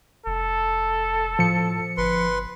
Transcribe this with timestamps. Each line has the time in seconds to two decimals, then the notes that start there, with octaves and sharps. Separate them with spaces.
0.26 F1 A4
1.39 A2 F3 C#7
1.97 G1 B4 C6